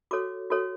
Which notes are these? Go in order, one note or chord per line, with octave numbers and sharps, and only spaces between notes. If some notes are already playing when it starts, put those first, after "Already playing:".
F#4 A4 C#5 D6
F#4 A4 C#5